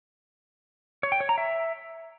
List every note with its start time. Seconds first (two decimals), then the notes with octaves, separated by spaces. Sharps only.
1.03 C#5
1.12 G5
1.20 C#5
1.29 A#5
1.38 E5